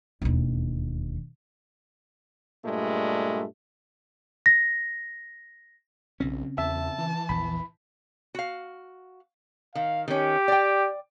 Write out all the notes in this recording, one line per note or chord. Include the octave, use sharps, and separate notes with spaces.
E1 D#2
G2 A#2 G#3 A3
A#6
B1 C#3 C4 C#4
E2 E5 A5
E3
A#1 E2 B5
F#4 F5
D#3 F5
D#3 C#4 G4
D5 G5